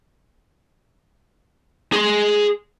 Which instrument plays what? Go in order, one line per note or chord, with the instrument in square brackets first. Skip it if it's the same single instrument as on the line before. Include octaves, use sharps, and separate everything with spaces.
[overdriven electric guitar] G#4 C6